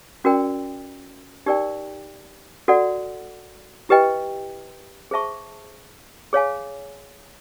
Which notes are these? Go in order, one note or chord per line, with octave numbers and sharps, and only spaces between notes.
C#4 F#4 A#4 D5 G5
D#4 G4 A#4 D5 G5
F#4 A4 D5 F#5
E4 G4 B4 D#5 G5
G#4 C5 E5 A5 C#6
G#4 C#5 F5 G#5